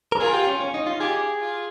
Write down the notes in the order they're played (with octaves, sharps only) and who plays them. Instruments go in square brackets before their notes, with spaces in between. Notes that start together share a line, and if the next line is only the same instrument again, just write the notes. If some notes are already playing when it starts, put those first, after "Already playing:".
[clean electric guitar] A#4
[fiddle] F4 [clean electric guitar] G#4
[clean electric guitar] G4
C#4
C#4
D#4
F4
[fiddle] G4 [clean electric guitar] G#4
[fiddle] F4